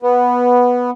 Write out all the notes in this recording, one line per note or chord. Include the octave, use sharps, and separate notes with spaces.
B3